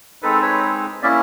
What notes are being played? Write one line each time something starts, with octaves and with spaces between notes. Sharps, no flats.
G#3 C4 D#4 A4 B4
B4 C#5
A#3 C#4 E4 D5 E5